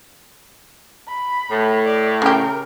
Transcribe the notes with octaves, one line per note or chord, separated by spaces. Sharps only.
B5
A2
D5
C#3 G4 A#4